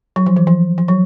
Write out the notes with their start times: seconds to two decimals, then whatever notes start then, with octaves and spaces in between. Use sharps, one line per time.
0.16 F#3
0.26 F3
0.36 E3
0.47 F3
0.78 F3
0.88 F#3